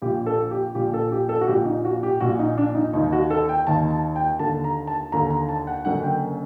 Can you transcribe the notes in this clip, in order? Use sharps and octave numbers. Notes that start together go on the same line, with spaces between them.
A#1 A#2 G4
A4
G4
A#1 A#2 G4
A4
G4
A4
F#4
A#1 A#2 G4
D#4
F#4
G4
A#1 A#2 F#4
D#4
D4
D#4
D#2 D#3 D#4
F#4
A4
G5
D#2 D#3 A5
A5
G5
D#2 D3 A5
A#5
A5
D#2 D3 A#5
A#5
A5
F#5
F#1 F#2 D3 F#5
G5